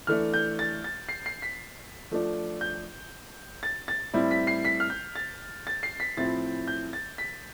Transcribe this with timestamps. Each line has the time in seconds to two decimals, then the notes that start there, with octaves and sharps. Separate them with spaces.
0.07 E3 A3 D4 F6
0.34 G6
0.59 A6
0.84 A6
1.09 C7
1.26 C7
1.42 B6
2.11 F3 A3 D4
2.61 G6
3.63 A6
3.88 A6
4.14 A2 G3 C4 E4
4.31 B6
4.47 C7
4.65 B6
4.80 F6
4.90 G6
5.16 A6
5.67 A6
5.83 C7
6.00 B6
6.17 A2 F3 C4 E4 A6
6.68 G6
6.93 A6
7.18 B6